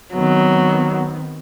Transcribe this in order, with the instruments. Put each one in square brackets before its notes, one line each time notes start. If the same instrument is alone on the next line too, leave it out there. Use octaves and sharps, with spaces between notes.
[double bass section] D#3 B3 C4 [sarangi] F#3